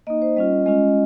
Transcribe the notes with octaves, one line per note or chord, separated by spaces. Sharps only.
A#3 D#4 D#5
C5
G3 C#4 F4 D#5
G#3 C#4 F4 D#5